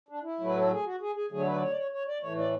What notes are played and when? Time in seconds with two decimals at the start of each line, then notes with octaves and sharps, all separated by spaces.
0.09 D4
0.23 E4
0.40 A2 F#3 A3 B4
0.57 A4
0.71 G#4
0.85 F#4
1.01 G#4
1.15 G#4
1.31 D3 F#3 A3 G#4
1.39 C#5
1.46 B4
1.55 D5
1.62 C#5
1.70 D5
1.77 C#5
1.93 C#5
2.08 D5
2.22 A2 E3 A3 C#5
2.38 D5